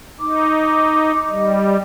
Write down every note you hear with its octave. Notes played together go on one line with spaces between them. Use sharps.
D#4 D6
G3 D#5